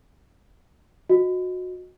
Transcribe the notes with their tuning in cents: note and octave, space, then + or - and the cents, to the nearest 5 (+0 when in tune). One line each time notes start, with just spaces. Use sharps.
F#4 -20 D#5 +0